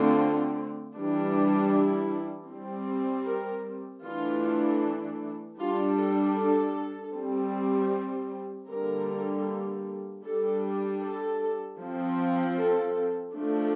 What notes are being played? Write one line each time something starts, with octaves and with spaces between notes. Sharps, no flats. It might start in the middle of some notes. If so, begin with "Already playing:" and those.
Already playing: D3 A3 C4 F4
E3 G3 D4
E4
G3 C4
A#4
E3 A3 D4 F4
G3 D4 F4
A4
A4
G3 C4
D3 G3 A#3 A#4
G3 D4 A4
A4
F3 C4
A4
F3 A3 D4